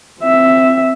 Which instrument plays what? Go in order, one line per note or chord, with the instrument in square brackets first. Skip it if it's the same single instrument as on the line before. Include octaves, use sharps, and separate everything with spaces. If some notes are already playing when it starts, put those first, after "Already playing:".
[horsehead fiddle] C4 E5